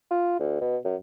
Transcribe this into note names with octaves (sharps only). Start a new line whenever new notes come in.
F4
D2
B2
F#2